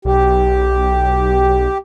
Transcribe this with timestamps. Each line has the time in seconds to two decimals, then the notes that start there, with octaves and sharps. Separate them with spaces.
0.05 B1 G4